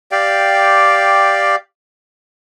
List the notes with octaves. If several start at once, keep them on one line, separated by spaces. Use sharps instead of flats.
G4 D5 F5 G5